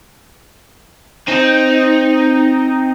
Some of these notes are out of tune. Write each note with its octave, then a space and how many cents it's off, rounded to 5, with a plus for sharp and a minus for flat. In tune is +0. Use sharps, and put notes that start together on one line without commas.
C4 +0 D#4 +0